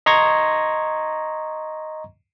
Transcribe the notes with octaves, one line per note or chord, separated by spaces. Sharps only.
D#5 A#5 C6 C#6 G#6 A#6